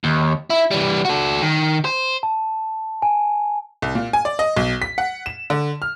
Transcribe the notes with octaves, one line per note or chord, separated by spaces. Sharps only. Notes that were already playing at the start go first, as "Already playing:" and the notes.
D#2
E4
E3 G3
F#4 A4
D#3
C5
A5
G#5
C2
A#2
G#5
D5
D#5
B1
B6
F#5
E7
D3
F6